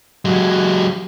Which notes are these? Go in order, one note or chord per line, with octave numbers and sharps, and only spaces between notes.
F#3 G#3